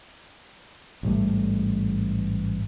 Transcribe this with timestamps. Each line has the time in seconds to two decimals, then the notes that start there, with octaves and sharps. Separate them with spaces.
1.03 A1 G#2 G3 A3